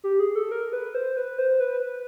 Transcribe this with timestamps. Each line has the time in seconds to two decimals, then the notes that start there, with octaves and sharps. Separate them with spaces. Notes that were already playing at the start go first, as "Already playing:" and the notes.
0.04 G4
0.19 G#4
0.36 A4
0.51 A#4
0.73 B4
0.95 C5
1.17 B4
1.38 C5
1.60 B4
1.81 B4